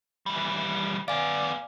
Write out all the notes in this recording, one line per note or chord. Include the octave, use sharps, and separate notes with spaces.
E3 G3
B3 D5 F5 G#5